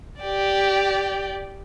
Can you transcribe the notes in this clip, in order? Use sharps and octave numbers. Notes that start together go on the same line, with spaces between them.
G4 D5